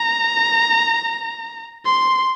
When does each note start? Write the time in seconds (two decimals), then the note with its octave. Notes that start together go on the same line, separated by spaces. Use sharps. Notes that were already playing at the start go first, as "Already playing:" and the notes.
Already playing: A#5
1.85 C6